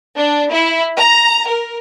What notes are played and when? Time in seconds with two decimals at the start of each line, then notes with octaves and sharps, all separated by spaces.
0.18 D4
0.53 E4
0.98 A#5
1.47 A#4